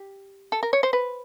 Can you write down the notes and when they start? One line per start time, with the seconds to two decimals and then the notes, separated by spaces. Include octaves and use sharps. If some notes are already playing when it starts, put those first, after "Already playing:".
Already playing: G4
0.52 A4
0.63 A#4
0.73 C#5
0.83 C5
0.93 B4